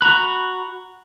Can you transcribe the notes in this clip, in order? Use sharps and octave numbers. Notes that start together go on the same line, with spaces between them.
F#4 A#5 B5 F#6